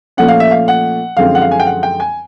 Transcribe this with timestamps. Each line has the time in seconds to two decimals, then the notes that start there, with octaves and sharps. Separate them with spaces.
0.17 A#2 F3 A3 C#4 F#5
0.28 F5
0.40 E5
0.51 F5
0.68 F#5
1.17 F#2 D3 F3 G#3 C4 F5
1.35 F#5
1.42 F5
1.51 G#5
1.60 G5
1.66 F#5
1.83 G5
2.00 G#5